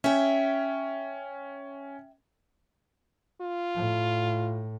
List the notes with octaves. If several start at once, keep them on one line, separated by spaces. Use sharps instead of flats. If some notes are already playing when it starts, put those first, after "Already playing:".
C#4 E5 G5 G#5
F4
A2